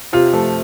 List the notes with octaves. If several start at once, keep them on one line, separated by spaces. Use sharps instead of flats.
C3 F4
F3 A3